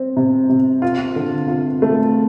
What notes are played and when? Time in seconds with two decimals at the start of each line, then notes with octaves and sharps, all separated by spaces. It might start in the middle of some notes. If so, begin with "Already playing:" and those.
Already playing: C4
0.17 C3
0.49 C3
0.82 F4
1.16 D3
1.48 F4
1.82 A3